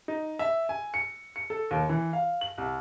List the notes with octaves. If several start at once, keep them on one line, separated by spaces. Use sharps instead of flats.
D#4
E5
G#5
C#7
C#7
A4
D#2
E3
F5
F#7
C2